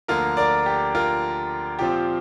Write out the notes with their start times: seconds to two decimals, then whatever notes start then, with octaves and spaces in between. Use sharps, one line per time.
0.08 D2 D3 F3 A#3 F4 A#4
0.37 A#4 D5
0.66 G4
0.95 F4 A#4
1.79 A#2 F3 C4 F4 G4